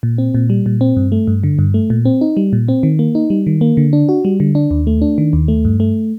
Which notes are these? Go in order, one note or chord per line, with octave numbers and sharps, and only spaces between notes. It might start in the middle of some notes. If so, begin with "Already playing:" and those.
A#2
C4
A#2
G3
A#2
C4
G2
A3
G2
D3
G2
A3
A#2
C4
D#4
G3
A#2
C4
D#3
A#3
D#4
G3
D#3
A#3
D3
D4
F#4
G3
D3
D4
D#2
A3
D4
D#3
D#2
A3
G2
A3